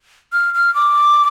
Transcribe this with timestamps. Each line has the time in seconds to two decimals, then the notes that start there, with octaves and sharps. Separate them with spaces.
0.33 F6
0.54 F6
0.75 D6